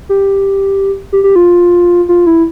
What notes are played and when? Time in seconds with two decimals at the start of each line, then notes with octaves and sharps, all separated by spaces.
0.09 G4
1.12 G4
1.24 G4
1.36 F4
2.09 F4
2.26 E4